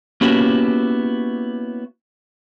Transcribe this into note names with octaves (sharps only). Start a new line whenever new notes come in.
A#3 B3 C#4 E4 F#4 G4